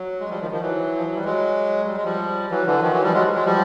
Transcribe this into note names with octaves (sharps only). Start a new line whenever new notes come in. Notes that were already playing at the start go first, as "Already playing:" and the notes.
Already playing: F#3
G#3
F3 G3
D#3 F3
D#3 F3
E3 F#3
F3
F#3
G3
F#3 G#3
G3
G#3
F3 G3
E3 F#3
D3 E3
D#3 F3
E3 F#3
F3 G3
F#3 G#3
F#3 G#3
F3 G3